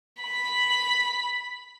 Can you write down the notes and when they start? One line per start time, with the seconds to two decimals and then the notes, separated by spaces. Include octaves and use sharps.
0.22 B5 B6